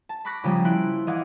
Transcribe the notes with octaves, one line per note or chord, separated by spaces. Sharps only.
A5
B5 C#6 D6 F#6 A#6 B6
C#3 F3 G3 A#3 C#4
E4 C6 F#6 D7
E3 D#5 F5 F#5 D6 G#6